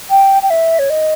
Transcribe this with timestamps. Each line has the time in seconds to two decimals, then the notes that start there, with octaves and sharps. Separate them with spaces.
0.10 G5
0.42 G5
0.50 E5
0.79 C#5
0.90 D#5